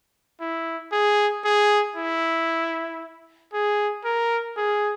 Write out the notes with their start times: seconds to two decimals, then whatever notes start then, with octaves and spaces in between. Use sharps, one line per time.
0.41 E4
0.92 G#4
1.45 G#4
1.96 E4
3.53 G#4
4.05 A#4
4.57 G#4